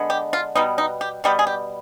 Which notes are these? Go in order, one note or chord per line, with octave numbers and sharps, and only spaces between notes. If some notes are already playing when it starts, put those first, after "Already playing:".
Already playing: D3 G#3 B3
G4
F4
B2 G3 B3 D#4
D#4
G4
B2 G3 B3 G4
G#4
G4